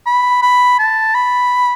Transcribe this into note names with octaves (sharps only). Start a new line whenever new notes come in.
B5
B5
A5
B5